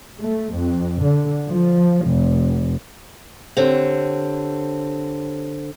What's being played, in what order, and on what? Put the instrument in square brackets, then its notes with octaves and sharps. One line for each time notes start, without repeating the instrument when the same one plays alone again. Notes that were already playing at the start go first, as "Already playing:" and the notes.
[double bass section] A3
F2
D3
F3
F1
[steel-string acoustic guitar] D3 C4 [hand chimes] G4 C5 C#5